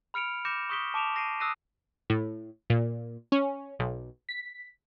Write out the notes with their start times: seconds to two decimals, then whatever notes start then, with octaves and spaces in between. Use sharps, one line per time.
0.14 B5 F6 C#7 D7 F7
0.45 D6 G6 A#6 C#7 E7
0.70 C#6 D#6 G6 B6 D7 G7
0.94 A5 D6 D7 E7 F7
1.16 A#6 C7 D7 D#7
1.40 D#6 E6 F#6 A#6 C7 D#7
2.10 A2
2.70 A#2
3.32 C#4
3.79 B1
4.29 B6